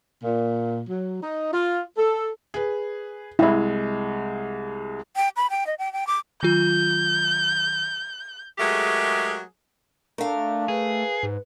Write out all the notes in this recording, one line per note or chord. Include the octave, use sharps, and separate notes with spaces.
A#2
F#3
D#4
F4
A4
G#4 B4
C2 G#3 E4
G5
B5
G5
D#5
G5
G5
D6
D#3 F#3 F4 G6
F#3 G#3 A3 G4 G#4 A#4
A3 D4 A#4 F5
G#4 B4
G#2